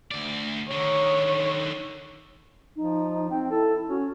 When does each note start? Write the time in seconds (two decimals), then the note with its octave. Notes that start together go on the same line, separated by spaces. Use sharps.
0.11 D2 D5
0.71 D3 D#3 C#5
2.76 F3 D#4
3.31 C4 G5
3.51 E4 A4
3.89 C#4 F#4